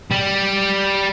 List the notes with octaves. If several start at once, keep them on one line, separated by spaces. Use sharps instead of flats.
G3